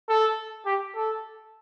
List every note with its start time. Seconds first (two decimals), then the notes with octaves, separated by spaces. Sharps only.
0.09 A4
0.66 G4
0.95 A4